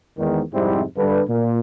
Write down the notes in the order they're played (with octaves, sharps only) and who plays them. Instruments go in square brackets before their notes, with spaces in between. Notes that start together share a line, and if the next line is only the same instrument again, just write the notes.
[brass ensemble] E2 G#2 D#3
F2 G#2 C3 G3 C4 E4
G2 D3 B4
A#2